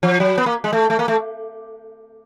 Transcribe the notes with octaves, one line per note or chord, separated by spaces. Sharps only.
F3
F#3
B3
A#3
G#3
A3
A3
A#3
A3